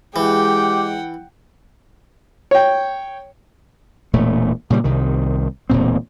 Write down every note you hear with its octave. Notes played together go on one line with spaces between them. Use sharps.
E3 G#3 G4 F#5 G5
C#5 G5
E1 A#2 A3
A#2 C#3 F#3 G3
C2 C3 D#3
E1 D2 A#2 C4